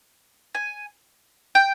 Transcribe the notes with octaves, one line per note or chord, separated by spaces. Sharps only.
G#5
G5